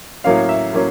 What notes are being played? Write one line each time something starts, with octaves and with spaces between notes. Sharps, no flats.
A2 F#3 A#3 C#4 F5
E5
A2 F#3 A#3 C#4